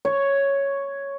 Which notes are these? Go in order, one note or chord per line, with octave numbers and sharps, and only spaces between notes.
C#5